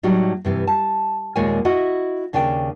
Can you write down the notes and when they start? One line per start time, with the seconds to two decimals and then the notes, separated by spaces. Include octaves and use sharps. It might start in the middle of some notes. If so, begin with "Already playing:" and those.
0.03 A2 F#3 G3 D#4
0.45 G2 C3 E3
0.67 A5
1.36 D#2 A#2 G#3 A#3 C#5 G#5
1.65 E4 F#4 D#5 E5 F#5
2.33 D#2 C#3 D4 G#4 G5